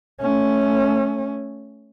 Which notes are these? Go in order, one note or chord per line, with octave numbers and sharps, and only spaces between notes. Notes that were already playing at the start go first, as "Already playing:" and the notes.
A3 C#4